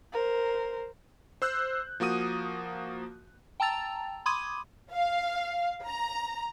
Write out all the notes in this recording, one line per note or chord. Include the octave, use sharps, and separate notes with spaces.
A#4 C5
C5 E6 F#6 G6
F3 A#3 F#4 D#6 D#7
G5 A5 A#5 E6 A6 F7
B5 C6 D6 D#6 G#6 D#7
F5
A#5